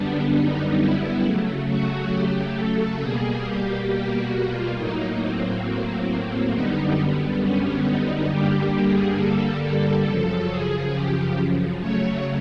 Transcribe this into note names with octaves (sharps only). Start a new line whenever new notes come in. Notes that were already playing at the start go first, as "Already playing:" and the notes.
Already playing: F#2 D3 G3 B3 D4
D#4
E4
C#3 F#3 A3
F#4
G4
A4
B2 G3 A#3 G#4
G4
G4
F#4
F4
A2 F#3 A#3 D#4
C4
F#2 D3 G3 B3 D#4
C#4
D#4
G2 D3 G3 A#3 G4
G4
G#4
A4
A4
F#2 C#3 F3 A4
G#4
G4
C#3 F#3 A3 C#5